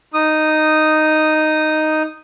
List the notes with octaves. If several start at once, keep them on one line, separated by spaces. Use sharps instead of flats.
D#4 D#6